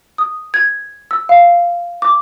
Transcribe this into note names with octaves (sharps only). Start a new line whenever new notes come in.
D#6
G#6
E6
F5
D6